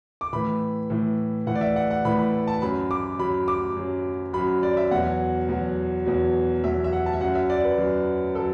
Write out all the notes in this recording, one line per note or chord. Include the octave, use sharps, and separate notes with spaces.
D6
A2 E3 B5
A2 E3
A2 E3 F#5
D5
E5
F#5
F#5
A2 E3 B5
B5
A5
F#2 F#3 B5
D6
F#2 F#3 B5
D6
F#2 F#3
F#2 F#3 B5
D5
E5
E2 B2 F#3 F#5
E2 B2 F#3
E2 B2 F#3
E2 B2 F#3 E5
E5
F#5
A5
E5
F#2 F#3 F#5
E5
D5
B4
F#2 F#3
F#3 A4